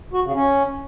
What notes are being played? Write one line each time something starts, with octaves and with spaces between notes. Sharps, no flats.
F#4
C#3
C#4